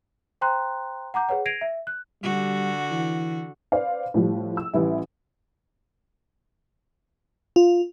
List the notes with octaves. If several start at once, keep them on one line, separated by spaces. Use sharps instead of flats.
C5 G5 A#5 C6 F#6
F#5 A#5 D6 G6
G#4 B4 C#5 F#5
G#6 A#6 C7 D7 D#7 F7
E5
F#6
D3 G3 F#4
E3
B4 C5 D5 F5
A2 F3 G3
E6
A1 E3 G3 E4
F4